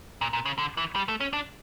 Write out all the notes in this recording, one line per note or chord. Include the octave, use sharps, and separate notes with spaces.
A#2
A#2
C#3
D3
E3
G3
A3
C#4
D4